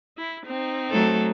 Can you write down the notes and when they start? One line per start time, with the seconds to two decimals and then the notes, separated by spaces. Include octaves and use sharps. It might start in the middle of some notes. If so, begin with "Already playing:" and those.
0.18 E4
0.46 C4 D#4
0.91 F#3 A3 A4